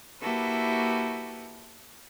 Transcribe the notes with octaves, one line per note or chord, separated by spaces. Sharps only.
A#3 E4 F#4 G4 A4 B4